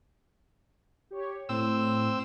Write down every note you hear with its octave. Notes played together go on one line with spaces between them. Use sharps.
G4 C#5
A2 C4 E6